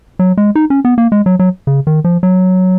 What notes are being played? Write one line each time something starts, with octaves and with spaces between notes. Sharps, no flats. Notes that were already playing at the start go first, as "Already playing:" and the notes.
F#3
G#3
D#4
C#4
B3
A#3
G#3
F#3
F#3
C#3
D#3
F3
F#3